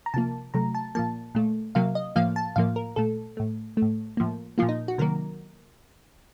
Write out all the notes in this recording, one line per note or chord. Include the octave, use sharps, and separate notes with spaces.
A#5
C3 F3 A#3 A5
C3 F#3 A3 A#5
A5
A#2 F3 A#3 A5
A#2 A3
C3 F#3 A#3 F5
D#5
A2 F3 A#3 F5
A5
A2 F3 A#3 F5
A#4
A#2 A3 A4
A2 A3
A3
A2
A2 F3 A#3
A#2 F3 A#3 F4
D#4
F#4
C3 D#3 F#3 A#3 A#4